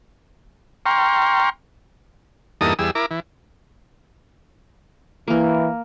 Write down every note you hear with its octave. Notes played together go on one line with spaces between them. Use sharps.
G5 A#5 C6 C#6 F6
E2 G2 A#3 D#4 A4 D#6
E2 G3 G#4 E6
E4 A#4 D6
E3
E3 A#3 A#4